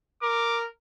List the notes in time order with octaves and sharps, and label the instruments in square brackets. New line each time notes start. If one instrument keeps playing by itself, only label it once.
[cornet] A#4 [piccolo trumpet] D6